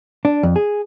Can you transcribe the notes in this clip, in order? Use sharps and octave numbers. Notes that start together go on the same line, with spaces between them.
D4
F2
G#4